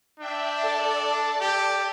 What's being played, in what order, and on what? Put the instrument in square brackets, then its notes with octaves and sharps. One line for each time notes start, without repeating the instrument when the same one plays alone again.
[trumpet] D4 [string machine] E5 G5
[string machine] A4 D5 A5
[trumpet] G4